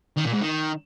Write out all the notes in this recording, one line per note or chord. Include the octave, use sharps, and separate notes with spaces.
D#3
A#2
G#2
D#3